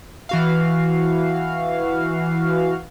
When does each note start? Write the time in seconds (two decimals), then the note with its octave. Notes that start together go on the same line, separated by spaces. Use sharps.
0.29 E3 F#4 F5